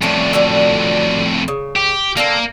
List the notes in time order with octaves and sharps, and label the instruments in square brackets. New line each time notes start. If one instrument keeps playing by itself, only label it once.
[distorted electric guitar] F2 A2 [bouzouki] E3 C#4 D4
[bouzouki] D3 F#3 D4
C#3
[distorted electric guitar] G4
[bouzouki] D3 C4 A4 [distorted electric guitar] A#3